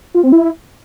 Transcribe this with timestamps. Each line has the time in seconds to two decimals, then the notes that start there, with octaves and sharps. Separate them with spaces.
0.15 F4
0.23 C4
0.32 E4